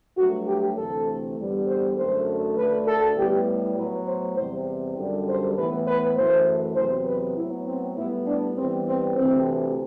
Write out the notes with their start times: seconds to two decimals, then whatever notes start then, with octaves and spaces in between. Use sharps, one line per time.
0.17 G2 F#3 A3 F#4
0.47 G4
0.77 D2 C3 E3 A3 A4
1.37 E2 D3 G3 B3
1.66 C5
1.97 F#2 D3 F#3 A3 C5
2.57 D2 D3 A3 B4
2.87 A4
3.16 A2 G3 B3 G4
3.76 A2 F#3 B3 B4
4.06 C5
4.37 E2 C3 G3 C5
4.97 F#2 D3 G3
5.27 C5
5.57 A2 E3 B3 B4
5.87 B4
6.17 F#2 E3 A3 C5
6.76 E2 C3 F#3 B3 C5
7.06 B4
7.37 A2 F#3 B3 E4
7.67 C4
7.96 A2 G3 B3 E4
8.26 D4
8.56 G2 E3 G3 B3 C4
8.87 C4
9.16 D2 C3 E3 A3 C4